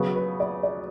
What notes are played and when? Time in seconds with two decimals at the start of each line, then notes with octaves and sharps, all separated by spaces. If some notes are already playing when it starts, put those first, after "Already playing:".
Already playing: C#3 F#3 B3
0.16 B4
0.40 D5
0.63 D5